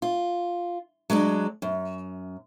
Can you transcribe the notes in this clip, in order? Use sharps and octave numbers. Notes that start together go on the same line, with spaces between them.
F4
F#3 G#3 C#4 D4
F#2